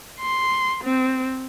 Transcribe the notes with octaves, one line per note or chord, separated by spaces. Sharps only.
C6
C4